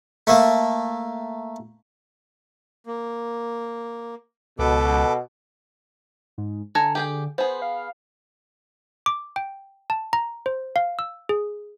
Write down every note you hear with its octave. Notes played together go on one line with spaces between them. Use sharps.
A3 A#3
A#3
C#2 B2 A4 B4 D6
G#2
D3 A4 G#5 A#5
G4 G#4 G5
B3 G#4 C5
F5
D6
G5
A5
A#5
C5
F5
E6
G#4